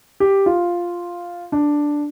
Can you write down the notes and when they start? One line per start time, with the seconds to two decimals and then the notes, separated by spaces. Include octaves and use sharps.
0.20 G4
0.46 F4
1.52 D4